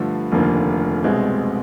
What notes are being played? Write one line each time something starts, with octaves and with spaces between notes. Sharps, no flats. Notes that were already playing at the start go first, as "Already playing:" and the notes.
Already playing: G2 D3 F3 A3
F1 D#2 D3 F3 A#3
C2 B2 G#3 C4